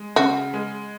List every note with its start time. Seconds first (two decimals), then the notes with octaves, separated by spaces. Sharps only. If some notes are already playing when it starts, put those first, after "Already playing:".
Already playing: G#3
0.16 C#3 F#4
0.54 G#3